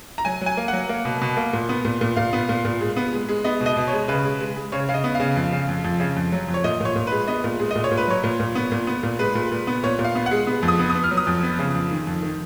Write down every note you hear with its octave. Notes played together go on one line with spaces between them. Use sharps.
A#5
F#3 G#5
F#3 G#5
A#3
F#3 F#5
A#3
B2
B2
A#3
A#2
B3
A#2
A#2
A#2 F5
B3
A#2
A#2
G#3
B3
G#3
G#3
B3 D#5
B2
D#5
B2
C#5
G#3
C#3 B4
G#3
G#3
G#3
C#3 C#5
C#3 F5
D#5
B3
C#3 F5
F2
C#3
F2
F2
C#3
F2
F#3
F2
C#5
A#2 D#5
A#2 C#5
A#2
G#3 B4
B3 D#5
A#2
G#3
A#2 D#5
C#5
A#2
B4
F#3 C#5
A#2
A#2
B3
A#2
B3
A#2
G#3 B4
A#2
A#2
B3
A#2 C#5
A#2
F5
B3
F#5
G#3
B3
F2
D#6
B3
D#6
B3
F6
F#3
D#6
F2
B3
C#3
F2
D#3
F2
D#3